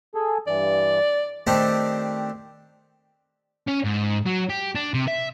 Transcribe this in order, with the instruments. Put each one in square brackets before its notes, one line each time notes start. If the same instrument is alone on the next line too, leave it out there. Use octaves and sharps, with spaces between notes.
[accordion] G#4 A4
[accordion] G2 E3 [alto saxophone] D5
[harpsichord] D#3 A3 C4 D4 G4
[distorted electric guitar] C#4
G#2
F#3
G4
D4
C3
E5